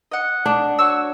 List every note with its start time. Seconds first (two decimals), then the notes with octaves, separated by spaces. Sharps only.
0.12 D#5 F#5
0.46 D4
0.79 F#4 C#5 E6